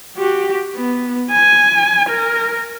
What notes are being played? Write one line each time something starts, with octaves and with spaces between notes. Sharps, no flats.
F#4 G4
B3
G#5
A#4